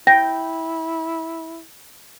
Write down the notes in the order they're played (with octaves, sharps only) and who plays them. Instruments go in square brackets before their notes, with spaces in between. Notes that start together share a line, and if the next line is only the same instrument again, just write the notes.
[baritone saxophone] E4 [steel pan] G5 [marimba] A#6